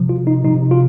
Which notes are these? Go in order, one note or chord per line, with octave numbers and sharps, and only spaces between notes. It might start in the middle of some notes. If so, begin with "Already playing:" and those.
Already playing: C3 F3
F4
D#4
C3 F3 D#4
F4